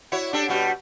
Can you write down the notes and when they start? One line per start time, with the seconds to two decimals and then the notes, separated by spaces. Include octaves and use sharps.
0.12 E4 F#4 C#5
0.33 D4 G4 A4
0.48 B2 G3 F#4